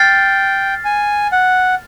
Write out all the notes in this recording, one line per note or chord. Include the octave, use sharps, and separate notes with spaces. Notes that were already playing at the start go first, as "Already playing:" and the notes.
Already playing: G5 F6 A6 C7
G#5
F#5